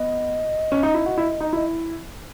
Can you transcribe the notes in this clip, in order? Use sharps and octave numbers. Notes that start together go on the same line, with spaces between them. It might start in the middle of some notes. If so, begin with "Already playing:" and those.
Already playing: B3 D#5
C#4
D#4
E4
F#4
E4
D#4
E4 D#5